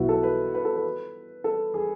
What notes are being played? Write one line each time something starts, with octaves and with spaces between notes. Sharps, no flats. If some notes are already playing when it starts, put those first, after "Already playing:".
Already playing: B1 B2 F#3 B3 E4 F#4
A4
B4
B4
A4
B4
A4
G#4